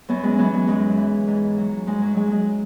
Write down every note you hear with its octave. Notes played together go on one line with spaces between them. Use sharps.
F#2 F#3 B3
G#3 C#4
E3 F#3 B3
G#3
F#2 G#3
E3
G#2
F#3
G#2 G#3
F#3
F#3 G#3
G#3